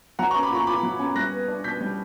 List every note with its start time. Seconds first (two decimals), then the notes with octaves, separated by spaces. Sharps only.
0.19 F#3 F#5 A#5
0.31 A#5 C#6
0.35 C#4
0.43 B5 D6
0.51 A#2 A#5 C#6
0.67 A#2 B5 D6
0.83 F#3
0.99 C#4
1.16 G3 F#6 A#6
1.32 B3
1.48 D4
1.64 B2 G6 B6
1.81 G3